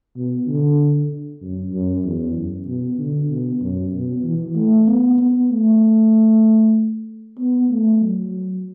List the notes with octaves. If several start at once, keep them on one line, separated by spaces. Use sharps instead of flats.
B2
D3
F#2
F#2
E2
F#2
B2
D3
B2
F#2
B2
E3
A3
B3
B3
A3
B3
A3
F#3